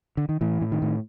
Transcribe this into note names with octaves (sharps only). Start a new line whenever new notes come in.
D3
D#3
A2 E3
A2
D#3
A2